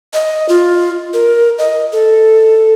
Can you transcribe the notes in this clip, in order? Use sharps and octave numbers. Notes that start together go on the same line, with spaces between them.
D#5
F4
A#4
D#5
A4